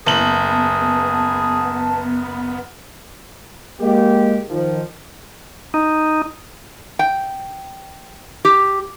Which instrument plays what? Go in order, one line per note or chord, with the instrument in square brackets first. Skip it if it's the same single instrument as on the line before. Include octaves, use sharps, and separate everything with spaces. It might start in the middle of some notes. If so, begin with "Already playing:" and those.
[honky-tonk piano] F#1 F#7 [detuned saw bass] B3 [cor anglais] G#4 [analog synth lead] A5
[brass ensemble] G#3 A#3 G4
D#3 F3
[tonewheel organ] D#4
[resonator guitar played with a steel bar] G5
G4